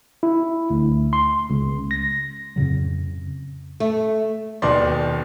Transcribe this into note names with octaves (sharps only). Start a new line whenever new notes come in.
E4
D2
C6
C#2
A#6
F2 A2 C#3 F#3
A3
D#1 D#2 B2 D5 C6 A6